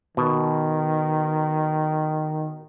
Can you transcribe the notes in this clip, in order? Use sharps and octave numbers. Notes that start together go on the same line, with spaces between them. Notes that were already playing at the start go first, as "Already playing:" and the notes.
B2 D#3